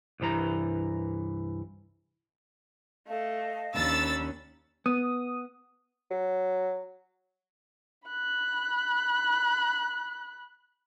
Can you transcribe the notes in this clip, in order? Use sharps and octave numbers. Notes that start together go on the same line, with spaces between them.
C2 G2 E3 A#5
A3 A4 D#5 F5
D#2 C#4 D4 B5 E6 A6
B3 D#6
F#3
B5 F#6